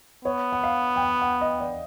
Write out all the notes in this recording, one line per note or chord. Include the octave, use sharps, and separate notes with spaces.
B3 C#5
F#5
F5
G5
F#5
F#5
D#5
D5